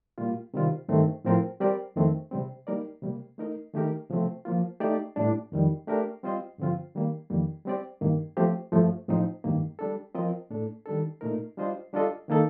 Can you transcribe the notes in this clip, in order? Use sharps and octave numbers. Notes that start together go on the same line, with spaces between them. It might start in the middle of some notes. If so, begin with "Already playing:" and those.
A#2 G3 A#3 F4
C3 D#3 G3 C4 F4
G2 D#3 A3 C4
A2 F3 C4 F4 A#4
G3 C4 G4 A#4 D5
F2 D#3 A3 C4
C3 G3 C4
G3 A#3 D#4 A#4 D5
C3 G3 A#3
A3 D#4 A#4 D#5
D#3 A3 D#4 G4 A#4
C3 F3 A3 C4
F3 A#3 F4
A3 D#4 G4 D5
A2 G3 D4
F2 D#3 G3
A3 D4 G4 A#4
G3 C4 F4 C5 D#5
G2 D3 F3 C4 F4
D#3 G3 A#3
F2 D#3 G3 A#3
G3 C4 G4 D5
G2 D#3 A#3
F3 A3 C4 G4
G2 F3 A3
A2 F3 C4 D#4
G2 D#3 A#3
G3 D4 A4
F3 C4 F4 A#4 D#5
A2 A3 D4 A4
D#3 G3 D4 A4
A#2 A3 D#4 A#4
G3 D4 F4 C5 D#5
G3 D4 F4 A4 D#5
D#3 A#3 D#4 A4